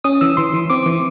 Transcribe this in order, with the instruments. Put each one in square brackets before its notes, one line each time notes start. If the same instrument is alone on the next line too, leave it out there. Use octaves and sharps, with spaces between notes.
[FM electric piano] C#4 D#6
E3 E6
E3 C6
E3
C4 D6
E3